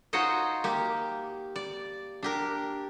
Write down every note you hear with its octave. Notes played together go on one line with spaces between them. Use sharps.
D#4 F4 F#4 C5 C#5 D#5
A#3 G4
D5
D4 G4 A#4